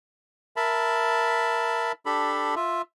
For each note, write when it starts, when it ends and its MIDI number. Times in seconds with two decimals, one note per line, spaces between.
0.56 1.92 70
0.56 1.92 76
0.56 1.92 81
0.56 1.92 83
2.06 2.55 62
2.06 2.55 67
2.06 2.55 69
2.06 2.55 83
2.56 2.82 65
2.56 2.82 76